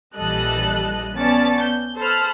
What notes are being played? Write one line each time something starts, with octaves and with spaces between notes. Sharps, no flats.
A#1 E3 G3 A4 D#5 F#6
B3 C#4 D5 A5 A6 C#7
G6
A4 C5 A5 B5 F6